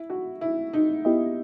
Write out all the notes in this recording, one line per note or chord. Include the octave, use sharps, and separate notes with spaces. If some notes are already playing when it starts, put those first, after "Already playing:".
Already playing: E4
F#4
E4
D#4
B3 E4 G4 D#5